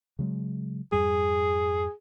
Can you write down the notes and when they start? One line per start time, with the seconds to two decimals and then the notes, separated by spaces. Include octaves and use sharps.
0.19 C#3 F#3 G#3
0.92 F2 G#2 G3 G#4